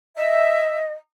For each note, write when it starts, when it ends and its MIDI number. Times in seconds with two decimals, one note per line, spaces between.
0.17 0.92 75
0.17 0.76 76